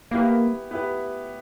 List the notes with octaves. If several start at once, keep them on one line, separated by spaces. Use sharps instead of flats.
A#3 B3 E4 G4 B4
B3 E4 G4 B4